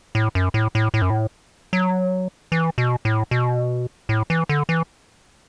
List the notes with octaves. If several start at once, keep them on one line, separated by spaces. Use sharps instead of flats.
A2
F#2
A2
A2
A2
F#2
A2
F#3
E3
B2
A2
B2
A2
E3
D3
E3